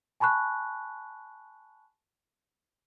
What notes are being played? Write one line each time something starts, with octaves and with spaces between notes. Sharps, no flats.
G#5 A5 B5 C#6 F#6